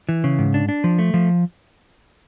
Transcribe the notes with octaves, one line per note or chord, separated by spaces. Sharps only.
E3
C#3
G#2
D4
D4
F3
A3
F3